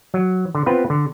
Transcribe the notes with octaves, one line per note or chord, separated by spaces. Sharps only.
F#3
D3
B3 C4 F4 B4
D3